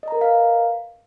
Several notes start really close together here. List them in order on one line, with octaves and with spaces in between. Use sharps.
D#5 A#5 A#4 B4 F5